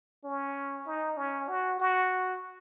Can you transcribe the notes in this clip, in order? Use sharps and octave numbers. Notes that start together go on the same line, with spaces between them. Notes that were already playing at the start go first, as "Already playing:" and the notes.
C#4
D#4
C#4
F#4
F#4